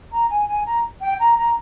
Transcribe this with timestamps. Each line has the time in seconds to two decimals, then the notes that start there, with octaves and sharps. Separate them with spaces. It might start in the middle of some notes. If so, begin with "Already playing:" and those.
0.12 A#5
0.29 G#5
0.47 G#5
0.65 A#5
1.01 G5
1.19 A#5
1.37 A#5